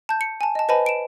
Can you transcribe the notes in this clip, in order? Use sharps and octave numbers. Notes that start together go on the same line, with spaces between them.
A5 G6
C#7
G#5 A5
D#5 A5
B4 C5 D#5 G#5 A5 B5
D7 E7